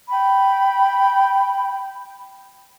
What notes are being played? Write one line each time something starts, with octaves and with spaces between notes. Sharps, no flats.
G5 B5